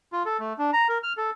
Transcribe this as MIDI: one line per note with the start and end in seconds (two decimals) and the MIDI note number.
0.13 0.23 65
0.26 0.37 69
0.39 0.53 57
0.58 0.71 62
0.73 0.88 82
0.89 0.98 70
1.03 1.13 89
1.17 1.30 69